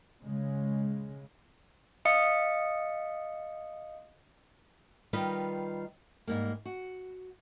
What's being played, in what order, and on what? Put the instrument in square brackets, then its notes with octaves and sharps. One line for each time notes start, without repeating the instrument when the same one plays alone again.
[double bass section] C#3 G#3
[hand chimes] D#5 F5 D#6 C#7
[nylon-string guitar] D#3 G3 F4 G4 B4 D#5
G#2 G3 A#3
F#4